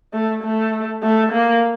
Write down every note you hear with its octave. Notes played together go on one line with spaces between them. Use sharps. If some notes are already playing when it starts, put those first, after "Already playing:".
A3
A3
A3
A#3